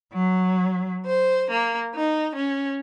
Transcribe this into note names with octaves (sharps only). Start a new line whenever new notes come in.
F#3
C5
A#3
D#4
C#4